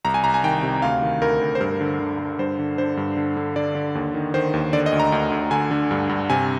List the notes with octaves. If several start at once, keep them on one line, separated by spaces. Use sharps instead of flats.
C2 A#5
G#5
C2 A#5
G#5
D#3 G5
C3
D2 F5
D#3
D2 A#4
D2
C5
G2 A#4
D3
D3
D3
G2 C5
D3
D3 C5
G2
D3
D3
D3 D5
D3
D#2
D#3
D#3 C5
D#2
D3 D5
D#5
D2
A#5
D2
D2
D3 G#5
D3
G2
G2
C3 G#5